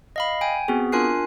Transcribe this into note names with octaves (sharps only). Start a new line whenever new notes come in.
D#5 F5 B5
G5 G#5
B3 C4 F#4 G#4
D4 F4 A#4 G#5 F#6 C7